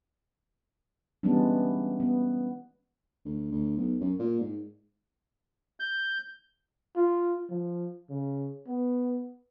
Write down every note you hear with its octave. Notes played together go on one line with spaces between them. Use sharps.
E3 G3 G#3 B3 C#4 D4
B3
D2
D2
B1
F#2
A#2
G#2
G6
F4
F3
C#3
B3